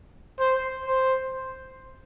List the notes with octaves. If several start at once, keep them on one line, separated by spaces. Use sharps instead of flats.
C5
C5